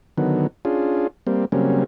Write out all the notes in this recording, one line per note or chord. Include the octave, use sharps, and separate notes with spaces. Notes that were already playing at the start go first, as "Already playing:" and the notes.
D3 D#3 F#3 B3
C#4 D4 F4 G#4
G3 A#3 C4
C#3 F#3 G3 A#3 C4 C#4